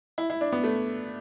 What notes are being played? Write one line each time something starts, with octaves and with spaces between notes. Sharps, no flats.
E4
E4
D4
B3
A3